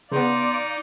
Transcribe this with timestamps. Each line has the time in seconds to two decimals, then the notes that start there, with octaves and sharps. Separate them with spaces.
0.12 C#3 B3 D#4 D5 F5 C6 D6